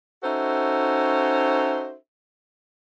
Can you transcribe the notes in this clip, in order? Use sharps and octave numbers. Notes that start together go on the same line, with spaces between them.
C#4 D#4 F#4 A4 C5 E5